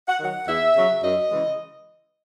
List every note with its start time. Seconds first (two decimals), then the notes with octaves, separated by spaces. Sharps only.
0.08 F#5
0.20 D#3 F#3 F#5
0.47 E2 E5
0.75 C#3 F#3
1.03 F#2 D#5
1.31 C#3 E3 G#3